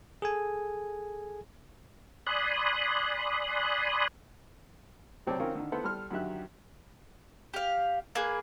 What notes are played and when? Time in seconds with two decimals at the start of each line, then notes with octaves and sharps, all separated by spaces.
0.22 G#4 A4 G#5
2.27 D5 G#5 B5 C6 D#6 F#6
5.27 B1 C3 C4 C#5 D5 A5
5.39 D#3 C4 C#4 F4 A#4
5.55 D3 D#3
5.72 B3 E4 A4 B4 C5 F#5
5.84 G3 A4 C6 F6
6.11 F#2 D3 D#3 G4 E5 F#6
7.54 G4 F5
8.15 A#3 G#4 B4